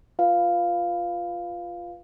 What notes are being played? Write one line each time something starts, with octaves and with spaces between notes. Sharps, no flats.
F4 B4 F5